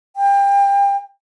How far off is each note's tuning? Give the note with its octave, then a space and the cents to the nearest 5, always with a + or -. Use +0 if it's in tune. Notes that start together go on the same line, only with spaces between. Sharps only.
G5 +30